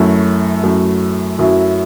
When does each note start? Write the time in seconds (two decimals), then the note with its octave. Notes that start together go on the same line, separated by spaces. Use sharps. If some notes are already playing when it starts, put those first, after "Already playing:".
Already playing: F#2 F#3 A3 E4
0.63 F#2 F#3 A3 E4
1.39 F#2 F#3 A3 E4